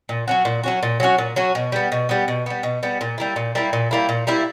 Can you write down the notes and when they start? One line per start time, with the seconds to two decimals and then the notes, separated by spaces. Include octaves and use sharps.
0.09 A#2
0.28 F#3 C#4 F#4
0.45 A#2
0.63 F#3 C#4 F#4
0.83 A#2
1.00 F#3 C#4 F#4
1.18 A#2
1.36 F#3 C#4 F#4
1.55 B2
1.72 G3 B3
1.92 B2
2.09 G3 B3
2.28 B2
2.46 G3 B3
2.63 B2
2.83 G3 B3
3.01 A#2
3.18 G3 A#3 E4
3.36 A#2
3.55 G3 A#3 E4
3.73 A#2
3.91 G3 A#3 E4
4.09 A#2
4.27 G3 A#3 E4